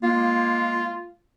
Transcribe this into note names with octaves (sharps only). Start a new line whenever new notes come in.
G#3 A#3 F4